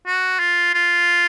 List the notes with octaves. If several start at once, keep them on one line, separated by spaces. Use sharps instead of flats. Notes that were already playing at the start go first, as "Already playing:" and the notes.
F#4
F4
F4